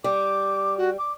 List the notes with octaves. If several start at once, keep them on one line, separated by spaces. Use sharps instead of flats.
G3 D6
F#4
D6